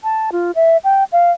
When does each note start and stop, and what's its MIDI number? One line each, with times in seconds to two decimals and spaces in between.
0.04 0.30 81
0.32 0.51 65
0.55 0.77 76
0.84 1.04 79
1.12 1.31 77